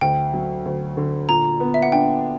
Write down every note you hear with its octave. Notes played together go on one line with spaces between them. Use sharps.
D2 G5
F#3
D2
D3
A#2 A#5
B3
E5
F#5
D4 G5